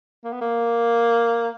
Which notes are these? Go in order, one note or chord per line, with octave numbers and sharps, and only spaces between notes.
A#3
B3
A#3